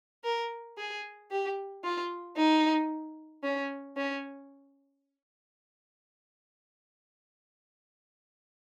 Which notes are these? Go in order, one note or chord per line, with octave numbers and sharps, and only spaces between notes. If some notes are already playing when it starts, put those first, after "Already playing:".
A#4
G#4
G4
F4
D#4
C#4
C#4